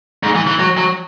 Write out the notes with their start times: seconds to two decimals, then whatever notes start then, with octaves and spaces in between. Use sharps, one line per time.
0.23 G#2
0.35 E3
0.47 E3
0.59 F#3
0.77 F#3